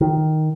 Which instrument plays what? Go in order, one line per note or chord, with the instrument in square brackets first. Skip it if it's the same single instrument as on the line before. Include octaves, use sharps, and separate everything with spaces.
[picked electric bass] D#3